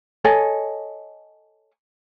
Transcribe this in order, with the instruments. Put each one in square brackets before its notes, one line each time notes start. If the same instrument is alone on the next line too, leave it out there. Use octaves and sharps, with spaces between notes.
[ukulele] A4 C#5 D#5 G#5